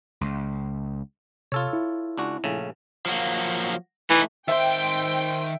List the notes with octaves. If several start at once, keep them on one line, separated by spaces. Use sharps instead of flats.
C#2
C3 F4 A4 C#5 E6
E4
C#2 D4 F#4
A#1 C#3 A3
F3 F#3 A#3
E3 A3 D#4
D#3 C5 E5 G5 C6